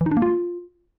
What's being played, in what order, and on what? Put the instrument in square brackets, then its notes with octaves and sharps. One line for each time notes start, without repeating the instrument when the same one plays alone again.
[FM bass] E3
D#4
D4
A#3
F4